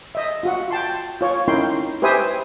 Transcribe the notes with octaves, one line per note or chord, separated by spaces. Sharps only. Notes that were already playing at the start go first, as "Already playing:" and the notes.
D#5 E5
F4 F#4 F#5
G5 A5 C6
F4 C#5
C#4 D#4 E4 A#4 G5 C6
G4 B4 C5 E5 G#5 D#6